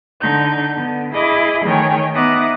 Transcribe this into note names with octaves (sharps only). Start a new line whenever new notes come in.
D3 D#4 G6
D3 B3
E4 G#4 D#5 B5 D6
D#3 E3 A3 G#4 C#5 G5
B3 D#4 E5 D6 D#6 F#6